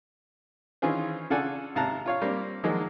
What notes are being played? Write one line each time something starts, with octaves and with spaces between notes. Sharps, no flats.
D#3 E3 C#4 F4 G#4 C5
C#3 F4 A4 D5 F#5 G#5
G#1 C3 F5 A5 A#5 F#6
F4 C#5 F5
G3 A#3 C4
D#3 F3 F#3 G#3 A#3